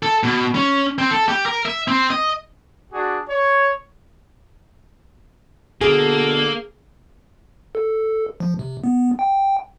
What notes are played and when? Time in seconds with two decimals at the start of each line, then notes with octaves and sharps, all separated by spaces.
0.03 A4
0.23 B2
0.55 C#4
0.98 C4
1.11 A4
1.28 G4
1.46 A#4
1.65 E5
1.88 C4
2.10 D#5
2.93 D4 F#4 G#4
3.28 C#5
5.81 B2 D3 A#3 G#4 A4
7.75 A4
8.40 F3
8.59 C3
8.84 B3
9.19 G5